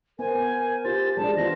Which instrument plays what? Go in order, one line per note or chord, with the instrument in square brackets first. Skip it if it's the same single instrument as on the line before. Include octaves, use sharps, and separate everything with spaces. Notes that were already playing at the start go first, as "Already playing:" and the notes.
[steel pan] B3 [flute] A#4 [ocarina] C5 [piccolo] G#5
[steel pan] F4 C5 [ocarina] G4 [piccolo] A6
[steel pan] G3 G#3 D4 [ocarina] G#4 [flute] D5 [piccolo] A5
[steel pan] E3 B3 F4 [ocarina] C5 [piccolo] A#6